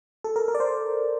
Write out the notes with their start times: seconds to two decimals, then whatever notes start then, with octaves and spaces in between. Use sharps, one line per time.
0.24 A4
0.36 A#4
0.48 A#4
0.55 D5
0.60 C5